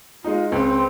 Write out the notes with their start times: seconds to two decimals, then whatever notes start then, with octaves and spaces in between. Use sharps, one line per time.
0.24 G#3 D#4 F4
0.52 C#2 C4